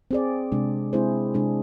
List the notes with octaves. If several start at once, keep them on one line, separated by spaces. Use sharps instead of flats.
C4 G#4 D5
C3 G#3 D4
G#3 C4 E4 G#4 C5
C3 G#3 D4 G#4